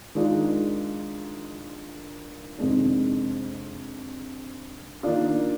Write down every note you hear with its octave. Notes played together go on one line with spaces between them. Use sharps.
D#3 G#3 D4 F4
F2 C3 D#3 G#3 D4
D#3 A#3 D4 F4